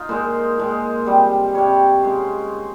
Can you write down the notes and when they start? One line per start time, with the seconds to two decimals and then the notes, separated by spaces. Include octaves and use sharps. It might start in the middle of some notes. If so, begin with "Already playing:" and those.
Already playing: D#4 F4
0.09 A#2 G#3 C5
0.58 A#2 G#3
1.06 C3 G3
1.55 C3 G3 C#5
2.03 C#3 G#3 C5